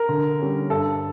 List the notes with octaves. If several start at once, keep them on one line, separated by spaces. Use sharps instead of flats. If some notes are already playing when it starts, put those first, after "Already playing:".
Already playing: A#4
D3
G3 C#4
G2 A4